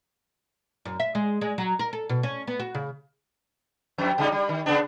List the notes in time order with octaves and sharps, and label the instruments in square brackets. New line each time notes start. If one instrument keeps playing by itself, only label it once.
[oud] F#2
E5
G#3
G#3
F#3
A#4
A4
B2
C#4
B3
F#4
C#3
[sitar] F2
C#3 G3 D#4
G3
D#3
C#3 B3 D4